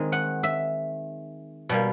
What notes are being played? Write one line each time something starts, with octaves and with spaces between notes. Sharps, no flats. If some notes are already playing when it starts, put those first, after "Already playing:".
Already playing: D#3 G#3 C4 D#4
F#5
E5
B2 G3 A#3